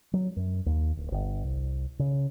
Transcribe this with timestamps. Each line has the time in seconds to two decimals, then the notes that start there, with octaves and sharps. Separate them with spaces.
0.13 F#3
0.37 F#2
0.66 D#2
0.97 D1
1.12 G1
1.44 C2
1.99 C#3